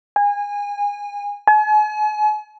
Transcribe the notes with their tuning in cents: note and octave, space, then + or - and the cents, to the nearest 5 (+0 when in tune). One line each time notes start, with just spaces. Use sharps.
G#5 -25
G#5 +40